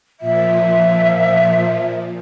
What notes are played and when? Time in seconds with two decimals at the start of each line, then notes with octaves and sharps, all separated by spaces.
0.20 A#2 F3 E5